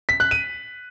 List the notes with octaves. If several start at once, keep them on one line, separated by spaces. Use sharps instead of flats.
B6
F#6
D#7